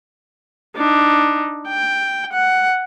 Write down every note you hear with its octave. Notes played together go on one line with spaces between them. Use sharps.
D4 D#4
G5
F#5